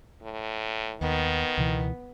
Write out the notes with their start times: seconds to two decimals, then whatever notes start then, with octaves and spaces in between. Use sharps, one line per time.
0.23 A2
1.01 D#2 D#3 B3
1.57 C#2 B2 E3